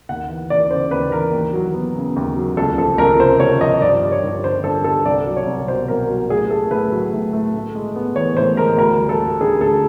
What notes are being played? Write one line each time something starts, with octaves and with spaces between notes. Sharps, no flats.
D#2 F#5
E3
D#2 D5
C#3 C5
D#2 B4
E3 A#4
D#2
F#3
B3
C#3
D#2
F#3
C#2 A4
F3 A4
C#2 A#4
C3 C5
C#2 C#5
F3 D#5
G2 D5
G3
C#5
G2
D3 C5
G2 A4
G3 A4
C2 D5
F#3
C#5
C2
B2 C5
C2 A#4
F#3
A2 G#4
A3 A4
A2 B4
F#3
A2
A3
A2
G#3
B3
E3 C#5
A2 C5
G#3 A#4
D2 A#4
G3
A4
A#3
D3 G#4
D2 A4